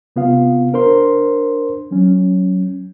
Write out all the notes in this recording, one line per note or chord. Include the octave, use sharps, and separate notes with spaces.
C3 B3 F4 F5
D4 A#4 C5 C6
F#3 C#4